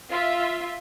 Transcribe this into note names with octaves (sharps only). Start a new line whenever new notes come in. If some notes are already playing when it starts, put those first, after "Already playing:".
F4 E5